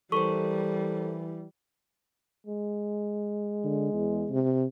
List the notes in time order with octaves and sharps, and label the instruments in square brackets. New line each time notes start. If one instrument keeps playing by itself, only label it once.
[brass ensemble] E3 [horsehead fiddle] G3 [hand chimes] A4 A#4 C5 [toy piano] C#6
[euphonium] G#3
[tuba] D3
E2
C3